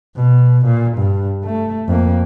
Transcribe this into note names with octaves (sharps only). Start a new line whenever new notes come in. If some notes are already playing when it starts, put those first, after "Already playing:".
B2
A#2
G2
A3
F2 A#3